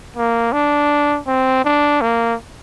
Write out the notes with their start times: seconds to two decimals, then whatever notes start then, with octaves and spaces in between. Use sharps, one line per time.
0.16 A#3
0.52 D4
1.27 C4
1.64 D4
2.01 A#3